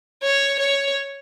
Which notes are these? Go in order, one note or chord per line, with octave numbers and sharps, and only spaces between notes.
C#5
C#5